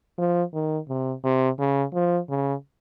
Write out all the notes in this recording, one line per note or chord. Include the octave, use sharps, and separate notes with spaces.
F3
D#3
C3
C3
C#3
F3
C#3